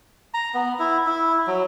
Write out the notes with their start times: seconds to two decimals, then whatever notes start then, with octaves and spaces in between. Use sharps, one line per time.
0.34 A#5
0.54 B3
0.79 E4
1.07 E4
1.47 F#3